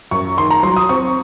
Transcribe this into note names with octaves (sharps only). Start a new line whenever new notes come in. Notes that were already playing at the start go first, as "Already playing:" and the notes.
F#2 C#6
D#3 C6
A#5
F#3 C6
D#6
C4 C#6